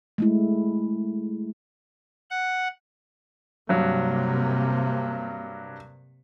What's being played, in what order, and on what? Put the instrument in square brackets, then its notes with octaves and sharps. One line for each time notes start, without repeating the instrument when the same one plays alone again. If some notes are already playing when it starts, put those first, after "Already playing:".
[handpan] G#3 A3 E4
[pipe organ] F#5
[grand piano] G2 F#3 [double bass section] C3 A#3